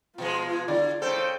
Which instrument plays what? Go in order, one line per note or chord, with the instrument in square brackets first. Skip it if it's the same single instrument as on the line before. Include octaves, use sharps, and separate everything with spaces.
[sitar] B2 F3 G#3 [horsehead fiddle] F4
[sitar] D3 [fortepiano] D5
[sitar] C#3 A4 [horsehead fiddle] C5 G5